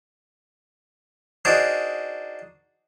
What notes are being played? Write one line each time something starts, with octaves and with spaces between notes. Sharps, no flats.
D4 D#4 F#4 G#4 A#4 C5